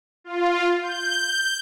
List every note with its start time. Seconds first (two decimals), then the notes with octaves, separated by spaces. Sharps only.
0.24 F4
0.81 G6